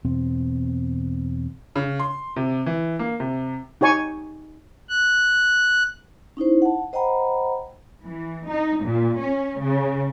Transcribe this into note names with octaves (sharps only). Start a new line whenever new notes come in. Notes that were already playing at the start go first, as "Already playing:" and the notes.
E2 B2 C4
C#3
C6
C3
E3
A#3
C3
D#4 G4 C#5 G#5 C#6
F#6
C#4 D#4 E4 C5
F#5 A5
C5 D#5 F#5 G5 A#5 B5
E3
D#4
A#2
C#4
C#3